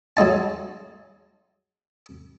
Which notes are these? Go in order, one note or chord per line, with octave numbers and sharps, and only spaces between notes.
F#3 G#3 D#4 A5